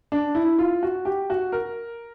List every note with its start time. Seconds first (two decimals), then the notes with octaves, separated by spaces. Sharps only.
0.12 D4
0.35 E4
0.59 F4
0.83 F#4
1.05 G4
1.30 F#4
1.52 A#4